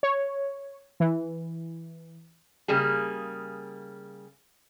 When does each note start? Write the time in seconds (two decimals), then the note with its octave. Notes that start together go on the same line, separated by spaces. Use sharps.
0.03 C#5
1.00 E3
2.68 C#3 G3 A#3 G#4